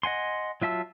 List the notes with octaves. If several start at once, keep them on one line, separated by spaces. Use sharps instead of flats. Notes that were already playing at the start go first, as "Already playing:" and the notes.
D#5 F#5 G#5 C6
F#3 F4 E5 A5 E6